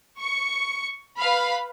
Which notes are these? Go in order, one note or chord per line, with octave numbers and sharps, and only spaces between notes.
C#6 C#7
B4 F5 B5